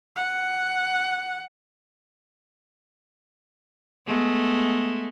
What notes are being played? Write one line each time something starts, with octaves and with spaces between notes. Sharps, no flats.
F#5
G#3 A3 B3